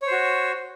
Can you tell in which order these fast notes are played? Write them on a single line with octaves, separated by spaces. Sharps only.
C#5 C5 F#4